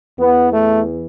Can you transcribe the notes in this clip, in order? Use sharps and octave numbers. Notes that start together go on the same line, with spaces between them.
E2 E3 B3
A3